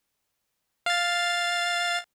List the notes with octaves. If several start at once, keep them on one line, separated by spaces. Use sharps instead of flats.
F5 A6